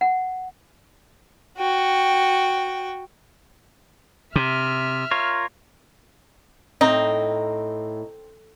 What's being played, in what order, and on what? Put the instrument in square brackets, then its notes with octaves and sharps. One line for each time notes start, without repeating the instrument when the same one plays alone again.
[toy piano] F#5
[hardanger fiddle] F#4 G5
[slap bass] C3 [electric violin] E5 F6
[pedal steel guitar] F4 A#4 C#5
[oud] A2 [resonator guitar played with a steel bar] C4 A#5 [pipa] D#4